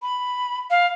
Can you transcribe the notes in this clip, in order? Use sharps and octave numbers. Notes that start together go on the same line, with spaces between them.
B5
F5